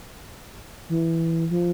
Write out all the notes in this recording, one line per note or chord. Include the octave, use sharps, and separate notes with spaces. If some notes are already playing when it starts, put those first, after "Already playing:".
E3
F3